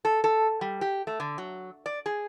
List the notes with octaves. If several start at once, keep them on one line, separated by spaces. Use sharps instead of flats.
A4
A4
G3
G4
A3
D3
F#3
D5
G#4